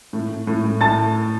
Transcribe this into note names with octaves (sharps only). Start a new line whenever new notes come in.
A2
A2
A2
A2
A2 A5 A6